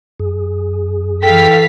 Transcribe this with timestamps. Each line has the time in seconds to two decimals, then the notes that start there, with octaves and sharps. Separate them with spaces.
0.20 F#2 G#4
1.23 E3 A4 F5 G5 B6